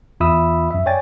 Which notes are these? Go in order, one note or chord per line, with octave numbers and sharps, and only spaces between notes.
E2 F4 E5 B5 D#6 E6
F#2 E5
C#5 D5 G5 G#5 A6